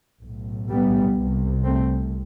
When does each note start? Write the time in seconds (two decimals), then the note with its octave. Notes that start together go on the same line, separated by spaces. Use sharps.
0.22 B1 A2
0.69 G3 B3
1.16 C2 C3
1.63 A3 C4